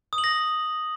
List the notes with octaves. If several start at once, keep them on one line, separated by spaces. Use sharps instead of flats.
D#6
F#7
A#6